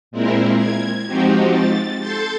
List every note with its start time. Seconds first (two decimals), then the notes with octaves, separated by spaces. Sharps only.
0.11 A#2 G#3 C4 E4 A#4
0.55 G#6
1.07 F3 G#3 C4 D#4 F#4 G4
1.51 A6
1.99 A4 C6 G6 A6